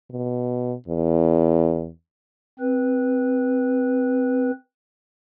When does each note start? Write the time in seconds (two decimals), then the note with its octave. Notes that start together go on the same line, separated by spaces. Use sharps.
0.11 B2
0.88 E2
2.60 C4 B4